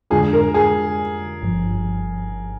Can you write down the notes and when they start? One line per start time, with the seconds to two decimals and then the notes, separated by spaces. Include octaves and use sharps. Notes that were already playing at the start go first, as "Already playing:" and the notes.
0.10 F2 D3 G#3 D4 F4 G#4
0.33 A#4
0.54 G#4
1.42 G1 G2 F3